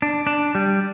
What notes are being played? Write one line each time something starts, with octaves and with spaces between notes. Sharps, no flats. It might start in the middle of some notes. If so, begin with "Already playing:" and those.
D4
D4
G3